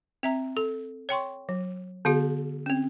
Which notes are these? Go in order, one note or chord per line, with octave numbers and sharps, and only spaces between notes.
C4 E5 A#5
A4
C#5 G5 C6 C#6
F#3
D3 B3 F#4 G#4
C4 C#4